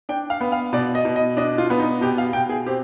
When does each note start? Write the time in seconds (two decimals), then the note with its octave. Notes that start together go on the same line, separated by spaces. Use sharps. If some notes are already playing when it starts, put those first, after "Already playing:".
0.09 D4 G5
0.30 F5
0.41 B3
0.52 F5
0.73 B2 D5
0.95 D#5
1.05 B2
1.16 D#5
1.37 D4 D#5
1.58 F4
1.70 B3
1.80 D#4
2.01 B2 G4
2.18 F5
2.33 B2 G5
2.49 G#4
2.66 C4 G4